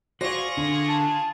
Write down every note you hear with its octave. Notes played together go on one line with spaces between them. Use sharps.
F4 F#4 G#4 C5 D5 C#6 A#6
D3 D4
A5